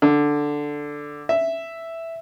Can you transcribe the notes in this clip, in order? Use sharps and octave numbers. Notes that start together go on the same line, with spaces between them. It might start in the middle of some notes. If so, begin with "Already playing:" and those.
D3
E5